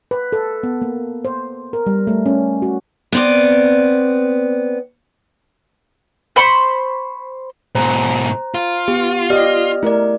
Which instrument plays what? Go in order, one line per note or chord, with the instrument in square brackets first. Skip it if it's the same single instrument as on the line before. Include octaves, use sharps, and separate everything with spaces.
[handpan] B4
A4
B3
A#3
C5
A#4
G3
A3
C#4
F#4
[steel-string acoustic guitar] B3 C4 D5
[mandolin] C5 B5 C#6
[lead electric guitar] G#2 B2 [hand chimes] C5 A#5
[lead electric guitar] F4
[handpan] B3 [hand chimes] G4
[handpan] G4 D#5 [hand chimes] D5 F6
[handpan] A3 A#4 [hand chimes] E4 D5